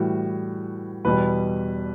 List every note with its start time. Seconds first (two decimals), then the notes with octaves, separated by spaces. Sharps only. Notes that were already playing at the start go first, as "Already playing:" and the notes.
Already playing: A2 E3 G3 F#4
1.05 E2 B2 G3 B4